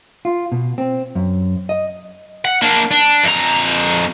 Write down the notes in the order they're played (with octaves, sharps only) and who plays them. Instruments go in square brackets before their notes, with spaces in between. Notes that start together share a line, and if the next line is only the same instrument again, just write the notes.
[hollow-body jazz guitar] F4
B2
C4
F#2
D#5
[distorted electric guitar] F#5
A#3 D4
D4
F2 A#5